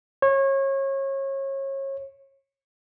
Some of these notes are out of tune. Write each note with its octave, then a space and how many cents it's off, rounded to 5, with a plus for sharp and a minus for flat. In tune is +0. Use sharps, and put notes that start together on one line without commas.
C#5 -30